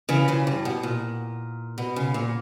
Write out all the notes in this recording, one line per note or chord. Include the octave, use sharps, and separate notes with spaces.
C#3 E3
C#3 E3
G2
B2
A#2
B2
C#3
A#2